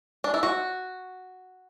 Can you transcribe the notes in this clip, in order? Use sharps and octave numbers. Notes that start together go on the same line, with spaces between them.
D4
E4
F#4